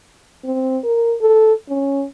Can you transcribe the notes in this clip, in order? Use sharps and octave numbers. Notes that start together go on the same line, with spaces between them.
C4
A#4
A4
C#4